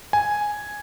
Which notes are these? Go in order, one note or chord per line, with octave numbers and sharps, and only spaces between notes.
G#5